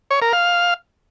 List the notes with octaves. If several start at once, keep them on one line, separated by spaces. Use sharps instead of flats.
C#5
A#4
F5